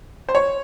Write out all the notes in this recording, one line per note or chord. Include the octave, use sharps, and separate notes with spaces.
C5
C#5